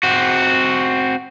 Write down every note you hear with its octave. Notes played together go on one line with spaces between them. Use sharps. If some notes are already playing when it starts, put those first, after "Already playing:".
C4 F#4